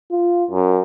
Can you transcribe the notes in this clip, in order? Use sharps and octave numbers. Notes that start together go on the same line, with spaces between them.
F4
F#2